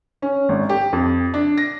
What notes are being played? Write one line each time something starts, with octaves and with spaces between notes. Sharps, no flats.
C#4
G#1
G4
F2
D4
A#6